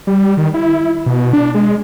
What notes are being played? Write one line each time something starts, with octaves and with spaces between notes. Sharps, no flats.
G3
D#3
E4
B2
D4
G#3